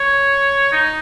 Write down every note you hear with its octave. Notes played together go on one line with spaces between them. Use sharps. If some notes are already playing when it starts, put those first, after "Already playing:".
Already playing: C#5
D#4